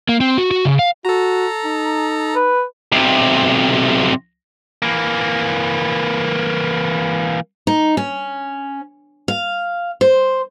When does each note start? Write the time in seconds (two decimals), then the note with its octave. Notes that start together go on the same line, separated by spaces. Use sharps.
0.09 A#3
0.21 C4
0.38 F#4
0.51 F#4
0.65 C#3
0.79 F5
1.05 F#4 A4 A#5
1.64 D#4
2.36 B4
2.92 B1 C3
4.82 E3 A#3
7.67 D#4
7.97 C#4
9.28 F5
10.01 C5